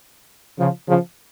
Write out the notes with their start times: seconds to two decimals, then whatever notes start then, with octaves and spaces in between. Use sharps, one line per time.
0.58 C#3 F3
0.87 C#3 F3